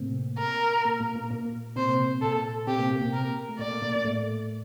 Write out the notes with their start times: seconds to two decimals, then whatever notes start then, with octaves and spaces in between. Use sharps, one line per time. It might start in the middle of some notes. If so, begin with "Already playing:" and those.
Already playing: A2 C3 A3 A#3 C4
0.39 A#4
0.85 A#2 A#3
1.00 A#2 A#3
1.15 A#2 A#3
1.31 A#2 A#3
1.76 C3 C4 C5
1.89 A#3
1.99 C3 C4
2.21 A#2 A#3 A4
2.67 C3 C4 G4
2.79 A#2 A#3
2.90 A#2 A#3
3.01 C3 C4
3.14 A#4
3.49 A3
3.59 A#2 A#3 D5
3.82 A#2 A#3
3.96 A#3
4.04 A2 A3